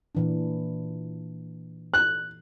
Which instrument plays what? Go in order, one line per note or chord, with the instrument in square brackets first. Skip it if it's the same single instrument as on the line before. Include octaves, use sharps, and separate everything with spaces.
[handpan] A#2 E3 D4
[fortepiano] F#6